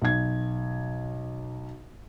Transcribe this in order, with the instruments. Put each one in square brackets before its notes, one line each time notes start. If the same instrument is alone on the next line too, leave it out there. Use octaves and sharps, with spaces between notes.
[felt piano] B1 G#6